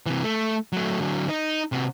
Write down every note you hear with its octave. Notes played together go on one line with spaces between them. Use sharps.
C3 E3
A3
F#3 A3
D3 F#3
D#4
C3 F#4